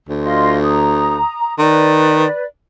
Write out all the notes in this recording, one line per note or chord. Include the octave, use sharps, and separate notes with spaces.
D2
F4 D#5 C6
A#5 D#6
D#3 B4 D5